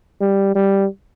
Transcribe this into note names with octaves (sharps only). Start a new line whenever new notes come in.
G3
G3